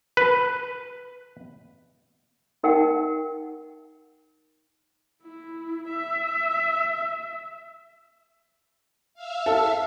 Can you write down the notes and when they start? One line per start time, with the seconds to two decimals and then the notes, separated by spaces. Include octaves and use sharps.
0.17 B4
2.63 D#4 A#4 F#5 G5
5.23 E4
5.89 E5
9.14 E5 F5
9.46 A4